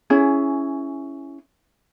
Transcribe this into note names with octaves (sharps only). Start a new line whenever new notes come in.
C#4 E4 G#4